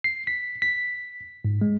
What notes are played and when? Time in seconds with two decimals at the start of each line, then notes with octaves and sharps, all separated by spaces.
0.04 C7
0.27 B6
0.62 B6
1.45 G#2
1.61 G#3